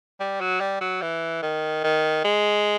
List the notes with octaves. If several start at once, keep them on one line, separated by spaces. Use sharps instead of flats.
G3
F#3
G3
F#3
E3
D#3
D#3
G#3